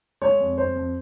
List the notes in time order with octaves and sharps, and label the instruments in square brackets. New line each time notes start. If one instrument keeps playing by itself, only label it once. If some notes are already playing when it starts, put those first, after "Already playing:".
[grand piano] G#3 C#5
F2
F2 C5
F2